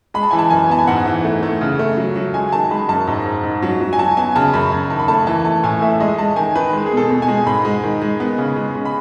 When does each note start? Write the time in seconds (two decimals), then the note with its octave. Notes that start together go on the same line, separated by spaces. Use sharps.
0.14 G#3 B5
0.23 A5
0.31 E3 G#5
0.39 A5
0.50 F#2 G#5
0.69 B3 A5
0.79 G#5
0.87 G#2 F#5
1.06 E3
1.24 A3
1.43 A3
1.61 C#3
1.79 A3
1.97 F#3
2.16 F#3
2.34 G#3 G#5
2.52 D#3 A5
2.71 G#3 B5
2.89 F#2 A5
3.07 G#2
3.26 G#2
3.43 G#2
3.62 F#3
3.80 F#3
3.93 G#5
3.98 F#3 A5
4.17 B3 G#5
4.36 C#3 A5
4.54 F#2 B5
4.73 F#2
4.90 D#3 A5
4.99 B5
5.08 A3 A5
5.27 E3 A5
5.45 A3 A5
5.63 A2 G#5
5.82 A3 E5
6.00 G#3 D#5
6.18 G#3 A5
6.36 D#3 G#5
6.55 D#3 B4
6.73 G#3
6.86 G#4
6.92 B2
6.97 A4
7.10 B2
7.22 G#5
7.28 G#3
7.46 G#2 B5
7.65 G#3
7.83 D#3
8.02 G#3
8.20 B3
8.38 C#3
8.56 G#3
8.75 C#3
8.85 B5